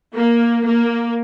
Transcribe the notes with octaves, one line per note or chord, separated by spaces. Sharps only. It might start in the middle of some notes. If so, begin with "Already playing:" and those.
A#3
A#3